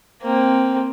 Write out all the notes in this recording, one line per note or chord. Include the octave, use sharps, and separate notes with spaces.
A#3 C4